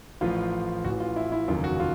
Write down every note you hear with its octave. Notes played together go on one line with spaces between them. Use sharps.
A1 A2 F3 F4
A1 A2 E3 F#4
F4
E4
E4
F1 D#2 C#3 F#3 F4
F#4
F4